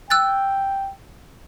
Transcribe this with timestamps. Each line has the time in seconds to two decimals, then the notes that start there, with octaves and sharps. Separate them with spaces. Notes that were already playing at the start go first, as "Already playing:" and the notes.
0.10 G5 E6 F#6 A6